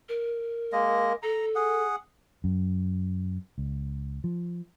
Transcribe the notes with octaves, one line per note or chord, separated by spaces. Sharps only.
A#4
G#3 A#3 D#5
A4 A#5
G#4 F#5
F#2
C#2
F3